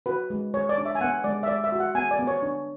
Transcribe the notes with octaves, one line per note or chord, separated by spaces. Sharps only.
F#4 B4
G#3
G#3 C#5
D5
D4
E5
G#5
B3 F#5
G#3 D5
E5
G#3 D5
E5
F#4
F#5
B3 G#5
D5
B3
C#5
D4